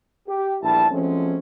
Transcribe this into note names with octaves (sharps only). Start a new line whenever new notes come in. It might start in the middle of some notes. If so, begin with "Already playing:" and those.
G4
A#1 E2 G3 E4 A5
F3 F#3 G#3 A3 C4 C#4